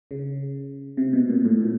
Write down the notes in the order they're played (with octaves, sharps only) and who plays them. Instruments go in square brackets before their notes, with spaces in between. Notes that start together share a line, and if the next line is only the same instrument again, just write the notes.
[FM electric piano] C#3
C3
B2
A#2
A2
A#2